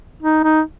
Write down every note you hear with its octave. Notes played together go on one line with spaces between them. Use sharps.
D#4
D#4